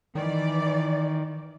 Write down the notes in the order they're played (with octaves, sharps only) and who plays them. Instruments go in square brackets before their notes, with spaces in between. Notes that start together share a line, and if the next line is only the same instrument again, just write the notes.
[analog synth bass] D#3 [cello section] E3 D5